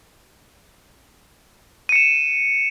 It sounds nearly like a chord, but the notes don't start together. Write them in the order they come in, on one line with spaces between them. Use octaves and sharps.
D#7 C#7 E7